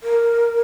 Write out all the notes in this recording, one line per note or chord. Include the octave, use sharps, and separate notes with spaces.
A#4